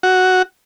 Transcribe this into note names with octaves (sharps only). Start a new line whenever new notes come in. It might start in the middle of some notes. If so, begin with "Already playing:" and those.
F#4